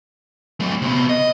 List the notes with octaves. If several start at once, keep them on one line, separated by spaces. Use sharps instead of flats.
F#3 A3
C3 B3
D#5